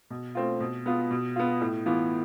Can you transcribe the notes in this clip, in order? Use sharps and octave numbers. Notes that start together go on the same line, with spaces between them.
B2
A3 C4 F4
B2
B3 F4
B2
B3 F4
A2
E3 B3 F4